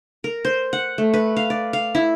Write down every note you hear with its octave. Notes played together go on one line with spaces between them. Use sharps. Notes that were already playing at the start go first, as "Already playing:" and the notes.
A#4
C5
F#5
A3
B4
F5
D5
F5
E4